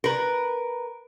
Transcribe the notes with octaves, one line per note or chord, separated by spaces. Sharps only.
A#4 B4